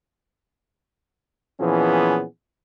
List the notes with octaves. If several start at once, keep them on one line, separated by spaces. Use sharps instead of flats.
A#2 E3 F3 B3 C#4 G#4